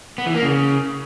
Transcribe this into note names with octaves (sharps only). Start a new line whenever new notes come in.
B3
E3
A#3
C#3